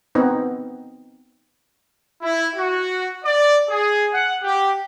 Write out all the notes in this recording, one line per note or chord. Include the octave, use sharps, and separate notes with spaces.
B3 C4 D#4
E4
F#4
D5
G#4
F#5
G4